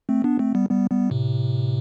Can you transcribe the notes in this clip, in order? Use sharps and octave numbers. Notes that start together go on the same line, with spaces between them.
A3 C4
B3 D4
A3 C4
G3 B3
G3 B3
G3 B3
A2 C3